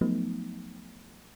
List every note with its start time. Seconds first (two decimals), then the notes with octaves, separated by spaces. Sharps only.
0.01 F3 F#3 A3 B3 D#4